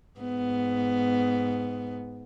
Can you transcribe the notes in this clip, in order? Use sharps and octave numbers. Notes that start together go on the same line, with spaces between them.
G#2 B3